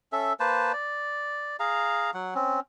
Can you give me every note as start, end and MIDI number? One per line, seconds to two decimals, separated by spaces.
0.12 0.33 61
0.12 0.33 69
0.12 0.33 76
0.40 0.72 58
0.40 0.72 71
0.40 0.72 72
0.40 0.72 81
0.73 1.56 74
1.60 2.11 68
1.60 2.11 77
1.60 2.11 82
2.14 2.34 54
2.14 2.34 78
2.35 2.60 60
2.35 2.60 61